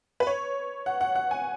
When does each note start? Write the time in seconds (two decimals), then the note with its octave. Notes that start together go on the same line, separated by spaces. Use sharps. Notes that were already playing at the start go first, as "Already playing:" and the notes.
0.20 B4
0.27 C#5
0.86 F#5
1.01 F#5
1.15 F#5
1.31 G#5